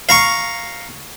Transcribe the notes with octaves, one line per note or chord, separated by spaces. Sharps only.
F5 A#5 C#6